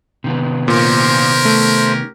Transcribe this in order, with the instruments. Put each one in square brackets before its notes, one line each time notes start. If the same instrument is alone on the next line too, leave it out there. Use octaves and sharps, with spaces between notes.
[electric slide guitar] C3 D#3 B3
[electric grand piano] A#2 [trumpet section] C#4 G4 A#4 [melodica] C5
[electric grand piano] A3